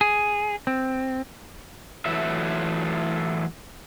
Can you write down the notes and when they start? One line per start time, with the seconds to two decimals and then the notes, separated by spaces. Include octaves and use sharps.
0.01 G#4
0.67 C4
2.06 E3 F#3 A3 E5